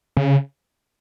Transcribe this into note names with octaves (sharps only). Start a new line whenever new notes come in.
C#3